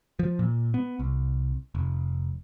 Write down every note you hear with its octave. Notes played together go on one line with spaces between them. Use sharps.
F3
A#2
B3
C2
F1